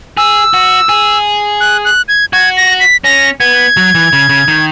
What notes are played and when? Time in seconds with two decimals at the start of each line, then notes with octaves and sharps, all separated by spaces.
0.17 G#4 E6
0.54 F#4
0.89 G#4
1.61 F#6
1.85 F#6
2.08 G#6
2.33 F#4 G#6
2.57 A#6
2.80 B6
3.04 C#4 A#6
3.40 B3 G#6
3.77 F#3
3.95 E3
4.13 C#3
4.29 C#3
4.48 D#3